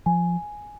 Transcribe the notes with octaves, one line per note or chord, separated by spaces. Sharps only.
F3 G#5